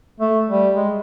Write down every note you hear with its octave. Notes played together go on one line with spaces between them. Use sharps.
A3
G3
G#3